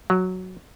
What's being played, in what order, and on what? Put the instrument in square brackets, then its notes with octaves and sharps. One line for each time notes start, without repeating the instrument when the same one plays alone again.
[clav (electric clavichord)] F#3